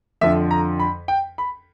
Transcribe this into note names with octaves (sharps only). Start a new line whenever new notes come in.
F2 D3 F3 E5
A#5
B5
G5
B5